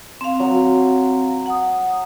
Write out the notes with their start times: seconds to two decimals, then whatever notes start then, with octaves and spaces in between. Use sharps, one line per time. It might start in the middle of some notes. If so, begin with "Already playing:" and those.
0.21 C4 F5
0.40 F#3
1.46 F#5 D#6